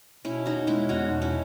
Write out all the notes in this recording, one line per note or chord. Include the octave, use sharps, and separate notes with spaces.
B2 C#4 E4
E2 D#4 F#4
G#3 C#4 E4
E2 D#4 F#4
B2
C#4 E4